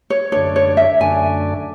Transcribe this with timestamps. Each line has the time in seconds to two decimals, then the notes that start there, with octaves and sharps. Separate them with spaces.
0.10 C#5
0.32 F#2 D3 A3 D4 C#5
0.56 C#5
0.77 E5
1.00 F#2 D3 A3 D4 G#5